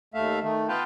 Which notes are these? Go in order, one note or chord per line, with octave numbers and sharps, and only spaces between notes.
D#2 A3 E5 F5
D#3 A3
B3 F4 B4 F5 G5 A5